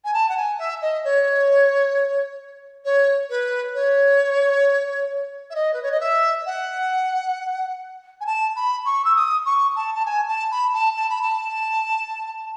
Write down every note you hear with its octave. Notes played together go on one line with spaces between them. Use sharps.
G#5
A5
F#5
G#5
E5
D#5
C#5
C#5
B4
C#5
E5
D#5
B4
C#5
D#5
E5
F#5
G#5
A5
B5
C#6
E6
D#6
C#6
A5
A5
G#5
A5
B5
A5
A5
B5
A5